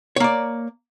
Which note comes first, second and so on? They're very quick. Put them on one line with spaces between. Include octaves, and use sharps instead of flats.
C#5 A#3 D5